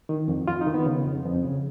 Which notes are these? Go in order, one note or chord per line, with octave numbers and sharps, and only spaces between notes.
D#3
F2
F2 F4
D#4
D#3
B3
C#3
F2
F2
C#3